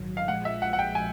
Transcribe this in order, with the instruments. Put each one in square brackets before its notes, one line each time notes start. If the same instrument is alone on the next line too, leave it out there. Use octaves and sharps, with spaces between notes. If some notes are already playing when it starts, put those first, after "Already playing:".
Already playing: [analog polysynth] A#1 G#2 D#3 F#3
[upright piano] F5
[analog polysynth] A#1 A#2 F3 G#3 [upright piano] F#5
[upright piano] E5
F#5
F#5
G5
G#5